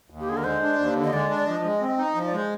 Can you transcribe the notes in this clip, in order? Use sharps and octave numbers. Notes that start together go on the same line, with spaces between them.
D#2
G4
D3 G#4
A#4
G#3 C5
D4
D#2
D3
D#5
G#3 D5
D4
D5
F3 D#5
G#3
C4
D#4
F3 D#5
D5
G#3 C5